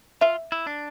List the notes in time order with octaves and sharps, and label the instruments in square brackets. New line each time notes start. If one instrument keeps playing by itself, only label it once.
[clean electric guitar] F4 [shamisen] E5
[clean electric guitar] E4
D4